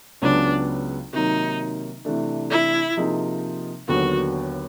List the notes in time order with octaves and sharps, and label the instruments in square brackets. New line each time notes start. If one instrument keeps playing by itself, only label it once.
[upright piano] C#2 C#3 F#3 B3 [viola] D4
[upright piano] C3 D#3 F#3 A#3 [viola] D#4
[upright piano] C3 E3 A3 D4
[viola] E4
[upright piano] C3 F3 A#3 D#4 G#4
[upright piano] D#2 D3 F#3 B3 [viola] F#4